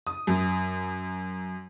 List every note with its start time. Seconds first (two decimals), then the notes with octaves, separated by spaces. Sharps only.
0.07 D#6
0.27 F#2